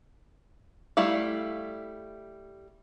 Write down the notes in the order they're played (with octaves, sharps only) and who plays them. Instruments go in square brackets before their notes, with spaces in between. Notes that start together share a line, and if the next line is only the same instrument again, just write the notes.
[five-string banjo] G3 A3 E4 F5